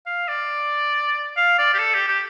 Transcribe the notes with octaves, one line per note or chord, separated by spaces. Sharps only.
F5
D5
F5
D5
G4
A4
G4
G4